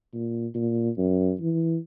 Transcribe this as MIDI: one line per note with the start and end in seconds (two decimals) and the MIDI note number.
0.14 0.47 46
0.54 0.90 46
0.97 1.33 42
1.40 1.77 52